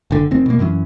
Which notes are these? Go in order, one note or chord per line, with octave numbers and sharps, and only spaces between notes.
F#1 D3
F1 D#3 C4
B2 A#3
F#2 E3 F#3 C#4